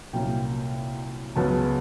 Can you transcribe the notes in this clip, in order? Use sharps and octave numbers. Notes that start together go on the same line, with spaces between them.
C2 A#2 F#3 A#3 C#4 G5
C#2 C#3 F#3 B3 A5